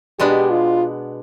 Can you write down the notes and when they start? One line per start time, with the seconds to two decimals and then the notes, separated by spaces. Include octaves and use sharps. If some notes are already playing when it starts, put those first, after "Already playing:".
0.19 B2 G#3 B3 D4 G4
0.51 F4